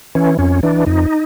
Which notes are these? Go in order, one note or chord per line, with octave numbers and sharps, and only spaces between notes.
E3 C#4
F2 C#4
E3 D4
F2 D#4